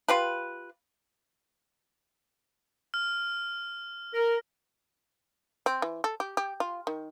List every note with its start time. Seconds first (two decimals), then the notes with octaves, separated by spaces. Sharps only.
0.09 F4 G4 B4
2.94 F6
4.14 A#4
5.66 C4
5.82 E3
6.04 A4
6.20 G4
6.37 G4
6.60 F4
6.87 D#3